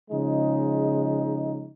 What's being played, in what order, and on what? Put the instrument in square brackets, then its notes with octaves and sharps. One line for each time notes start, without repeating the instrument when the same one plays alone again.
[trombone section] C#3 F3 G#3 D#4